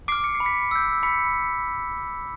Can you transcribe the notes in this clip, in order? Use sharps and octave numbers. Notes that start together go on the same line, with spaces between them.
D6 F6 C7 D7
C#7
C7
B5
B6 C#7
E6 G6
B5 B6 C#7